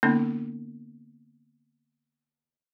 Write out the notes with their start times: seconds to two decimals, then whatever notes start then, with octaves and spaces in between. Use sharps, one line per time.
0.03 D3 A#3 B3 C#4 D#4